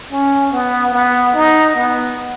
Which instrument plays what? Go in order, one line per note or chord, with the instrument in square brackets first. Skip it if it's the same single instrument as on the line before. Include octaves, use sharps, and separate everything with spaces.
[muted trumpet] C#4
B3
B3
D#4
B3